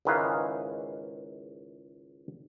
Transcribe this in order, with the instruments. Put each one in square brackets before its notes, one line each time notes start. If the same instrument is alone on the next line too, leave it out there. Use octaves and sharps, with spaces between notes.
[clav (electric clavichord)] C#2 G#2 D#3 E3 B4 F5